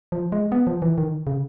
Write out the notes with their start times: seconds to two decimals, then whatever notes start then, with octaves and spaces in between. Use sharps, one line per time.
0.12 F3
0.32 G#3
0.52 B3
0.67 F3
0.82 E3
0.98 D#3
1.27 C#3